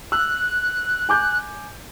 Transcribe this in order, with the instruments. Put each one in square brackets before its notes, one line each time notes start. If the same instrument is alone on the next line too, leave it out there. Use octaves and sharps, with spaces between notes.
[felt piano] E6 [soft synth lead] F#6
[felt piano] G#5 D6 G6